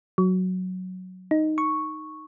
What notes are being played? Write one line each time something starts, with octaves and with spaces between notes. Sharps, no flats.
F#3
D#4
C#6